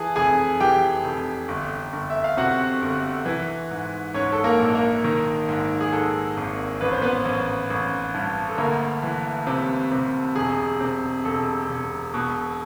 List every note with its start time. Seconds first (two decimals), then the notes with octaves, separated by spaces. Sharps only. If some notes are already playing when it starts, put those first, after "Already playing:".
Already playing: E3 G#4 G#5 A5
0.16 F1 G#4 G#5
0.60 E3 G4 G5
1.04 F1
1.48 G1
1.93 G1
2.10 E5
2.24 F5
2.37 C3 F#4 F#5
2.82 G1
3.26 E3
3.71 G#2
4.14 G#2 C#4 C#5
4.32 A4
4.44 A#3 A#4
4.59 A#1
4.74 A#3 A#4
5.04 D#3
5.49 G#2
5.80 G#4
5.92 G#2 A4
6.37 G#1
6.81 A1 B4
6.92 C5
7.02 B3 B4
7.25 A1
7.70 A1
8.14 G2
8.49 A4
8.58 D2 A#3 A#4
9.03 E3
9.47 C3
9.92 C3
10.36 E1 G#4
10.80 C3
11.25 E1 A4
11.69 E1
12.14 B2